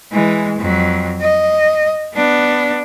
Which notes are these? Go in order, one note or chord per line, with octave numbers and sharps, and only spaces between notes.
E3 G#3
F2 F#3
D#5
B3 D4